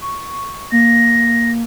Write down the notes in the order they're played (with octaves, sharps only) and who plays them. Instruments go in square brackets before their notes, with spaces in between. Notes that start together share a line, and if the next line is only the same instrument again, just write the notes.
[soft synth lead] C#6
[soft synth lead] A#3 [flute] A#6